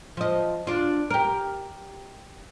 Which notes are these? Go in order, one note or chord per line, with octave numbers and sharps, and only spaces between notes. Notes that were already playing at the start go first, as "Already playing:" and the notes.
F3 D#5
D4 F4
G4 A#4